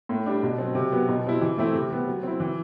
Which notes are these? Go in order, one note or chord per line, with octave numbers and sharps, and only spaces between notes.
A2
G3 D4
B2
F#3 C4
C3
F#3 B3
B2
G3 C4 E4
E3
A3 C4 E4
C3
G3 B3
F#3
C4 E4
E3